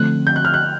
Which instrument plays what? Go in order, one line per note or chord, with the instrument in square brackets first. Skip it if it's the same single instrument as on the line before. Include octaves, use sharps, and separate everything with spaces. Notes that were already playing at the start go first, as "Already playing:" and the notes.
Already playing: [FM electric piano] D3 F3 A3 C4 [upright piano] F#6
[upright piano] G6
F#6
F6
F#6